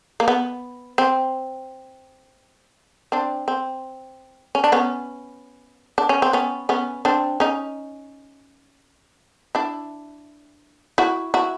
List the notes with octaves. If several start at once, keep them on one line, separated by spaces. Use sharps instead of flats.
A#3
B3
C4
C4 D4
C4
C#4
D4
B3 C#4
D4
C#4
C4
B3 C#4
B3 C#4
C4 D4
C#4 D#4
D4 E4
E4 F#4
E4 F#4